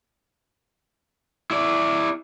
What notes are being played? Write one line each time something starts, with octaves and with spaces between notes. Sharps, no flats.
E4 D5